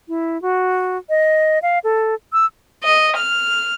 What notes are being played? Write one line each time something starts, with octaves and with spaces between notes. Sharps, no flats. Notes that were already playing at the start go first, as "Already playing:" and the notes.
E4
F#4
D#5
F5
A4
E6
D#5
F6